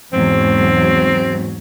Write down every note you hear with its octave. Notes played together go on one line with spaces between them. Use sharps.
E2 G#2 F#3 C4